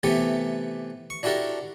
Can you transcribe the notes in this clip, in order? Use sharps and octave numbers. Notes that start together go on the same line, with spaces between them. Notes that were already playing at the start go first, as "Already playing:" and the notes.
C3 E3 A3 B3 G4
C#6
D4 E4 F#4 G4 A4 A#4